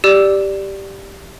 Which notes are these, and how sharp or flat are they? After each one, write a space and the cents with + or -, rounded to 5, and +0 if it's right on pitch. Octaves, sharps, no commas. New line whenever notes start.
G4 +0 D5 +0 E6 +0